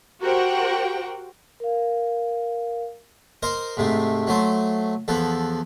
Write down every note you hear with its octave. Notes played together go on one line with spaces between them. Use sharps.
F#4 G4 A#4 C5 F#5 G5
A#4 F5
A#4 C5 D#5
G#2 C3 A3
F#3 A3 C5
E2 F3 B3 A4